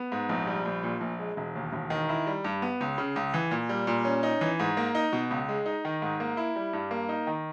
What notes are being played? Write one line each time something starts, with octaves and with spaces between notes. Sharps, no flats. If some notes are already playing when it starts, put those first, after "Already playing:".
Already playing: B3
G#2
A#1
G3
A#1
A#2
A#1
G#3
E1
D#2
E1
D#3
E4
G3
G2
B3
C#2
C#3
C#2
E3
A#2
G3
A#2
C#4
D#4
E3
G#2
A#3
D#4
B2
C#2
G#3
D#4
D#3
G#2
A#3
E4
G3
G2
A#3
D#4
D#3